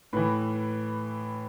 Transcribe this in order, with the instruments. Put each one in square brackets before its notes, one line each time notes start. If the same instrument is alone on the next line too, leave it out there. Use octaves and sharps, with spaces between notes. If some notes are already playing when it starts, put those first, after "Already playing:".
[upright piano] A2 E3 B4